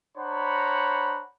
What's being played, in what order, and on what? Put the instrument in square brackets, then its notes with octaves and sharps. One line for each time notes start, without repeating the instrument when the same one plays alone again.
[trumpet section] D4 C5 C#5 F#5 A#5 B5